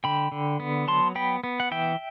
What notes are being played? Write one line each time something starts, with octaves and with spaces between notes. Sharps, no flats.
D3 G5 B5
D3
B3
F#3 A5 C6
B3 G5 B5
B3
F#5
E3 E5 G5